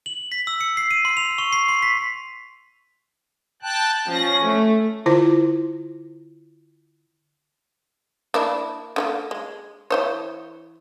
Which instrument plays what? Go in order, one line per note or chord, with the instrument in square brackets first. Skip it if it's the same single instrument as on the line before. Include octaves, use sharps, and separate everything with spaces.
[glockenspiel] F#7
B6
E6
C#7
C7
D#7
C6
F7
C#6
C7
C6
B6
[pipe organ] G5 A5 F#6
[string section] F3 A#6 [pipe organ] C#4
[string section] A3
[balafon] D3 E4 F4 C5
[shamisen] A#3 D4 E4
D3 F3 A#3
G#3
E3 C5 C#5